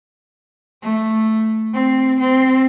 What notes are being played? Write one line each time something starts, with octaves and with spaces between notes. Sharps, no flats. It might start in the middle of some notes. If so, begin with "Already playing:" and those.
A3
C4
C4